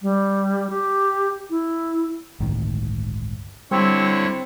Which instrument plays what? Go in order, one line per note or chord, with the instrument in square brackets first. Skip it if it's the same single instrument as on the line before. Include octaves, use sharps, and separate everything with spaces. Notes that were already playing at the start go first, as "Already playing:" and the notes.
[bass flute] G3
G4
E4
[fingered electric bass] G1 C#2 A2 D#3
[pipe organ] D3 E4 C#5 [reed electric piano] G3 [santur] C4